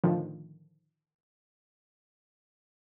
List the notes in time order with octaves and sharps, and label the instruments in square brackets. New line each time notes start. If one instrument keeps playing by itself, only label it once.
[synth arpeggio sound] A2 D3 D#3 F3